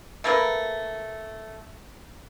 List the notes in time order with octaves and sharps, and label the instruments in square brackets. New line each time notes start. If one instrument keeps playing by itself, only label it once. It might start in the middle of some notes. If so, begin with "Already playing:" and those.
[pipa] A3 A#3 A#4 B4